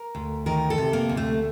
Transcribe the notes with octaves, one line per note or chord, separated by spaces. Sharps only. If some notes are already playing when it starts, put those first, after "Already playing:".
Already playing: A#4
D2
D#3 A#4
A4
C3
A#3
D2
A3